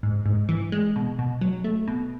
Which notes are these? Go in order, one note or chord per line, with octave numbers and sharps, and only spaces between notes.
G#2
G#2
E3
G#3
B2
B2
F#3
A3
B2